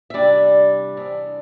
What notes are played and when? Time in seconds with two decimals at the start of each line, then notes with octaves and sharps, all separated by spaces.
0.10 E5
0.14 E2 C3 G3 D4 D5
0.97 E2 C3 G3 D4